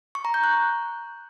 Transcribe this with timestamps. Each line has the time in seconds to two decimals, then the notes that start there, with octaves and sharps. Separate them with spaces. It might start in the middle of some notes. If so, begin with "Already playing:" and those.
0.15 C#6
0.25 A#5
0.34 G6
0.44 F#6